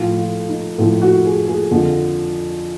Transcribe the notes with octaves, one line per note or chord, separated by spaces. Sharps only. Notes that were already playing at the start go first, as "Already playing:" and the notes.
Already playing: A2 F3 F4
F4
D#4
A2 F3 E4
F#4
G#4
G#4
F2 D3 F3